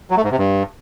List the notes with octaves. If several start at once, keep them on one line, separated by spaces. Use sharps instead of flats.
F#3
A3
G#2
C3
G2